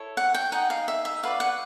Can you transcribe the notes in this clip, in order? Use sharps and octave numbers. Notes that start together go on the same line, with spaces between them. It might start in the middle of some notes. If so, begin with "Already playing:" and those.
Already playing: E4 A4 C#5
F#5
G5
D#4 G#4 C5 D#5 F#5
F5
E5
E5
F#4 B4 D5 F5
F#5